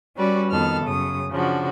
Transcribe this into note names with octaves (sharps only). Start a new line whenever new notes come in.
G3 C#4 F#4 B4 D5
F2 D#3 B3 A4 F6
F#2 C#3 D#6
C#3 F3 D4 F#4